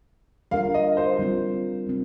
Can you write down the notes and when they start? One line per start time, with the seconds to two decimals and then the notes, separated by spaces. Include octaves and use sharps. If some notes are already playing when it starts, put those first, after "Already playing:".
0.51 G3 D4 F4 A#4 F5
0.74 D#5
0.97 C5
1.19 G3 C4 F4
1.87 G3 C4